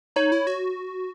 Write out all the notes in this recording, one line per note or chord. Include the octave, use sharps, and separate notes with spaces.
D#4 C#5
E4
F#4